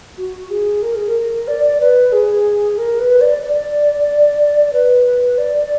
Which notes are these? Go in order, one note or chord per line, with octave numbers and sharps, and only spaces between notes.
F#4
G#4
A#4
G#4
A#4
D5
B4
G#4
A#4
B4
D5
D5
B4
D5